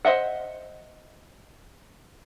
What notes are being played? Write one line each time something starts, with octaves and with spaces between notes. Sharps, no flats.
C5 D#5 E5 F#5